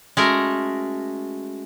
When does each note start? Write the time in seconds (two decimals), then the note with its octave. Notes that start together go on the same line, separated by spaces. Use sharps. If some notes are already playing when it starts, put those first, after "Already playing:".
0.17 G#3 A3 C#4 F#4 A#4